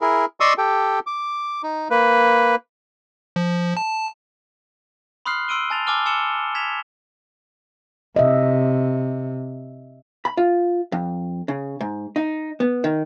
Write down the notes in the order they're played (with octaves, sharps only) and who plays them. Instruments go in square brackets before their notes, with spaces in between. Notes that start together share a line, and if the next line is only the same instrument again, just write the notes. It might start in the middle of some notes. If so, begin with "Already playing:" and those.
[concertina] E4 G#4 A#4
D5 D#5 C6 C#6 D#6 E6
G4 A4 G5
D6
D#4
A#3 B4
[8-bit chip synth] F3
A5
[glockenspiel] B5 C6 D#6 F6 F#6 C7
C6 E6 D7 D#7 G7
G#5 A5 A6 F7
G#5 A5 D6 E6 F6 G7
G#5 C6 E6 C#7 E7 G7
G#6 B6 E7 F7
[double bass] C3 [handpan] D#5 E5
[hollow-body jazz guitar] B5
F4
F2
C#3
G#2
D#4
B3
D#3